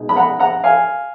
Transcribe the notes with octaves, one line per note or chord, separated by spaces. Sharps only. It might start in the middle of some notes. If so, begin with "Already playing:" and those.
Already playing: B2 G#3 D#4
B5
F#5 A#5
F#5 A#5
F5 G#5